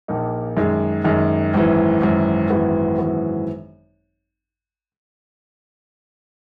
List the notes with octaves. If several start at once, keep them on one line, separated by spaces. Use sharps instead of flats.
A#1 A#2 A#3 D#4
F#2 D#3 G#3
F#2 D#3 G#3
G#1 F#2 E3
G#1 F#2 E3
G#1 F#2 E3 B3 F#4
G#1 F#2 E3 B3 F#4